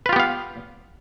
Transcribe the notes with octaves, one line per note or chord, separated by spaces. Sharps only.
B3 F4 G4 B4 F5